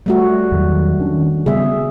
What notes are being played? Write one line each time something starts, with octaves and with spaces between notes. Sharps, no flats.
G3 A3 F#4
E2 D#3 F#3
D#3 C#4 D4
C#3 G3 B3 G#4 E5